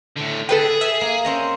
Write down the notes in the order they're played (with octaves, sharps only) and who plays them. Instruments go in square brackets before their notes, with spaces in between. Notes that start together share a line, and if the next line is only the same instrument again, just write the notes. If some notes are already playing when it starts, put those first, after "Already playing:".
[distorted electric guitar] A2 D3
[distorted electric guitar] G#4 [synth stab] A4 B4 G5
[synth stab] E5
[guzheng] A#3
C4 C#4 D#5